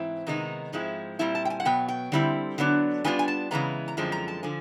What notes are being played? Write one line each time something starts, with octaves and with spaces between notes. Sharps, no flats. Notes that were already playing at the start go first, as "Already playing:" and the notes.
Already playing: G#2 E3 C4 E4
C3 D#3 G#3 B3 D#4 A#5
G#2 F3 G#3 C4 E4
A#2 G3 C4 E4 A5
A5
G5
G#5
F#5
B2 F#3 B3 G5
G5
D3 G3 C4 E4
D3 F#3 B3 D4
D#3 G3 B3 D4 F4 G#5
G#5
A5
C#3 E3 G#3 B3 A#5
A#5
F#2 D3 F3 G#3 C4 A5
A#5
A5
D3 F3 G#5